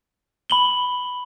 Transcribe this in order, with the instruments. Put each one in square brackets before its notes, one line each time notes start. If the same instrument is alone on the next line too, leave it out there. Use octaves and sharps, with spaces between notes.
[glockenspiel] B5 F#7 G7